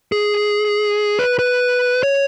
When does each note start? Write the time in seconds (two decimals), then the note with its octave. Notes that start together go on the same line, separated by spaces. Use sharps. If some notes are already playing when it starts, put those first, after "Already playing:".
0.12 G#4
1.19 B4
1.39 B4
2.03 C#5